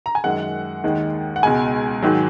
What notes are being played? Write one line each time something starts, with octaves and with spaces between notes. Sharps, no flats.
A#5
G#5
F#2 D#3 G#3 F#5
D#2 D#3 G#3
F#5
C#2 B2 G#3 G#5
G#2 D#3 F#3